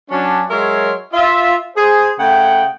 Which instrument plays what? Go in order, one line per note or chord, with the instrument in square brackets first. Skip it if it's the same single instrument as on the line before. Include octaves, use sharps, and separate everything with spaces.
[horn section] F#3 C#4 D4
F#3 G#3 A#4 C#5 E5 C6
F4 E5
G#4 C5
C#3 A3 F#5 G5